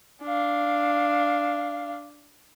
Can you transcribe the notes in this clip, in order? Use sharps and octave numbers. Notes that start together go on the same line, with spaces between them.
D4 F5